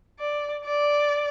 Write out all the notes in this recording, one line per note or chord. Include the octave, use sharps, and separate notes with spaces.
D5
D5